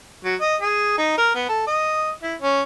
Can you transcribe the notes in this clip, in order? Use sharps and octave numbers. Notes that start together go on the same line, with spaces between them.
F#3
D#5
G#4
D#4
A#4
B3
A4
D#5
E4
C#4